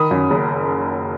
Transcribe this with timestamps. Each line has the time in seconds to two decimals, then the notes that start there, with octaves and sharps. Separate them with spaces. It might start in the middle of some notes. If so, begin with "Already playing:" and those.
Already playing: D#3 B5 D#6
0.11 F#2
0.30 F#1